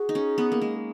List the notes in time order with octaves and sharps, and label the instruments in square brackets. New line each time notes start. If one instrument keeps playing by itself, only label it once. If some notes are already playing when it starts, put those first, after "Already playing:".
Already playing: [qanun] F#4 [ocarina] G#4
[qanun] D#4
C#4
B3
A#3
G#3